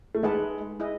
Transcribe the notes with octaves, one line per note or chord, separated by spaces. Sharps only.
A3
G#3 D#4 G#4 B4 F#5 A5
E4 G#4 D#5